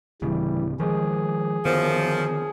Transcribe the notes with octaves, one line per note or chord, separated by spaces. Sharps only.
D1 C#3 E3 G3
D#3 F3 G#3 G#4
F#2 D3 D#3 F3 B3